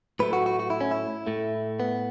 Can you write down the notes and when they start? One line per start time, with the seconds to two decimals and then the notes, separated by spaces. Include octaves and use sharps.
0.19 A2 F#3 A3 B4
0.33 F#4
0.46 F#4
0.60 F#4
0.70 E4
0.81 C#4
0.91 E4
1.27 A2 A3
1.80 B3